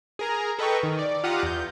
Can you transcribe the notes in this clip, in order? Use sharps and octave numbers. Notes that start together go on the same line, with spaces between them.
G#4 A#4 A#5
A4 B4 D#5 G5 A#5 C#6
D#3
D5
F4 G4 F5 F#5 A#5 D#6
E2 G6